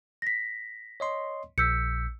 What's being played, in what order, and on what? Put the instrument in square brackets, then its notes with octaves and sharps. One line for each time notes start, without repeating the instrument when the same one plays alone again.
[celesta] A#6 B6
[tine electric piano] C#5 D#5 C6
[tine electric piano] A#1 B6 [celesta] E6 G6 C#7